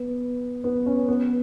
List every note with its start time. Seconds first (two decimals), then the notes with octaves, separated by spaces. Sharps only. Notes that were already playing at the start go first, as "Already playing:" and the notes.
Already playing: B3
0.64 B3
0.86 C#4
1.08 B3